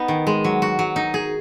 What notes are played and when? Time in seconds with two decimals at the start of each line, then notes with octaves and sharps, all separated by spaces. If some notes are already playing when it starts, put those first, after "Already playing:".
Already playing: B3 D#4
0.08 D#3
0.27 G#3
0.44 F#3
0.62 F#4
0.79 F#3
0.96 D#4
1.14 G#4